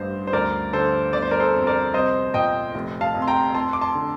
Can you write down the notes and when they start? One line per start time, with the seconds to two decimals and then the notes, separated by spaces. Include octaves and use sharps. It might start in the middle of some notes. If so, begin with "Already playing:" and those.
Already playing: A1 G2 C5
0.27 C5
0.33 D2 A#4 D5
0.73 D3 A4 C5
1.13 G1 D5
1.22 C5
1.31 A#4 D5
1.40 A4 C5
1.54 F2
1.67 A#4 D5
1.94 C2 C5 D#5
2.34 A#2 D#5 G5
2.75 F1
3.01 F5 A5
3.14 F2
3.22 C6
3.27 G5 A#5
3.54 F2 A5 C6
3.73 D6
3.81 A5 C6
3.95 D3